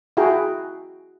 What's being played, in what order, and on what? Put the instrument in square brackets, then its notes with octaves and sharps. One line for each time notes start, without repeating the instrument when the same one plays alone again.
[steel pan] E4 F#4 G#4 G5 A#5